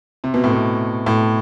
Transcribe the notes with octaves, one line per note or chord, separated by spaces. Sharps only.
C3
B2
A2
B2
A2